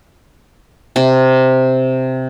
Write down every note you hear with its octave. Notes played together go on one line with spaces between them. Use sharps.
C3